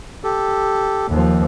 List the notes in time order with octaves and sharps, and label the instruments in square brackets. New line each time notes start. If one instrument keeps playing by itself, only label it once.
[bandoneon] G4 A4
[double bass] D#2 F3